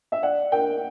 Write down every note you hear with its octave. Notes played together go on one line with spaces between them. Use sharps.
E5
D5 F#5
A#4 G5